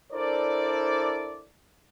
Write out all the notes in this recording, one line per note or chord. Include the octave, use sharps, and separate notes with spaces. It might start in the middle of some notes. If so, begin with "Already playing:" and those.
D4 E4 A4 A#4 C5 D5